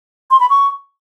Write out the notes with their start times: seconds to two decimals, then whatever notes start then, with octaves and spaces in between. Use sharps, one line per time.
0.31 C6
0.40 B5
0.50 C#6